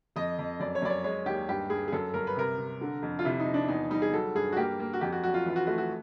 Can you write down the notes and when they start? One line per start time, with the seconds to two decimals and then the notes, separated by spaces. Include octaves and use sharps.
0.16 F2 D#5
0.38 F2
0.60 F#2 D5
0.75 C#5
0.82 F#2 D5
0.90 C#5
1.04 G#3 C#5
1.26 D#2 G4
1.49 G2 G4
1.70 G2 G#4
1.88 G#4
1.92 F#2 A4
2.14 G1 A#4
2.27 B4
2.36 C3 A#4
2.58 C3
2.81 D3
3.02 F2
3.19 F4
3.25 C3 E4
3.40 D#4
3.46 F3
3.54 D4
3.68 E2 D#4
3.90 G3 D#4
4.02 G#4
4.12 F#3 A4
4.35 G2 G#4
4.52 F#4
4.57 A#3 G4
4.80 A#3
4.93 F#4
5.01 F2 G4
5.12 F#4
5.23 F#3 F#4
5.34 F4
5.46 E3 F4
5.56 F#4
5.67 A3 F#4
5.78 F#4